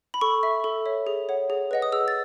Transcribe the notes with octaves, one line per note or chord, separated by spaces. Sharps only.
B5
A4 C#6
E5
A4
C#5 E5
G#4
C#5 F#5
G#4
B4 D#5 F#5
D#6
G#4 E6
A6